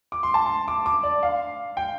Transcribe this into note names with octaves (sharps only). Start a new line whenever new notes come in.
D6
C6
A5
C6
D6
D6
D5
F5
G5